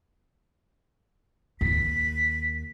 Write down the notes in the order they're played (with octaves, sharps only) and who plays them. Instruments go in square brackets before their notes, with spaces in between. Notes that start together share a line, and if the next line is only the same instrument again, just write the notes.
[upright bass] D#2 [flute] B6